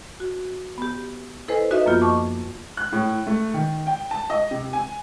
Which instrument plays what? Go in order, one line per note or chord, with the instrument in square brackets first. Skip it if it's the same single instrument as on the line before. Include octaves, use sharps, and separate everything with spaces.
[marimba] F#4
B3 G4
E4 A4 B4 C5 D#5 G#5
D#4 F#4 B4 D#5 E5
F#2 F3 A#3 B3 F4 G6
D#5 A5 C#6 D6
[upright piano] F#6
A2
A3
D#3
G5
A5
D#5
C3
G#5